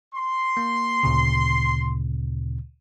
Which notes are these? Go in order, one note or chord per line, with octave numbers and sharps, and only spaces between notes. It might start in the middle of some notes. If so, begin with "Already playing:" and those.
C6
A#3
D2 A#2 C#3